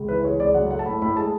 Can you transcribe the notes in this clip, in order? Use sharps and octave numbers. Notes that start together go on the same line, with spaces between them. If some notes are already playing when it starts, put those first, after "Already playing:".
Already playing: C#2
E3 B4
G#3 C#5
C#2 D5
F#3 F#5
A3 F#5
A5
A2 B5
A2 B5
G#3 A5